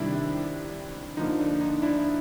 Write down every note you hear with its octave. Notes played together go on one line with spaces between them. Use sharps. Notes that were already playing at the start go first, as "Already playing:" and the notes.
Already playing: C3 D#3 G3 D4 E4
D3 F3 A#3 D#4
D4
D#4
D4 E4